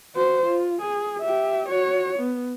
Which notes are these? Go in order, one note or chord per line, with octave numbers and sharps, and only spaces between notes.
F#4 C5
F4
G#4
G4 E5
F#4 C#5
B3